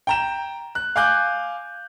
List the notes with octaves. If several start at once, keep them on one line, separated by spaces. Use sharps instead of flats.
G5 A#5 E7
F#6
F5 G#5 D6 F#6 G6